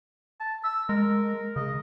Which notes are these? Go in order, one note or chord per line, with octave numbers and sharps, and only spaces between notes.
A5
E6
G#3 A#4
C#3 D#5